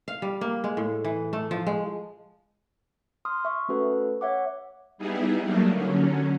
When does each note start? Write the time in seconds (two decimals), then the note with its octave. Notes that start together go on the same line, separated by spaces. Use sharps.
0.08 F5
0.22 G3
0.41 A#3
0.64 G#3
0.77 A2
1.04 E3
1.33 A3
1.51 F3
1.67 G#3
3.25 C6 D#6 F6
3.45 E5 C#6
3.69 A3 C#4 F#4 A4 B4
4.21 C#5 E5 F#5 D6
4.98 G3 B3 D#4 E4 G#4
5.43 F#3 G3 A3 A#3 D4 D#4
5.74 D3 F#3 C#4